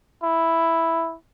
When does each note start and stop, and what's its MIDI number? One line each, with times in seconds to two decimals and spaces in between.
0.23 1.15 64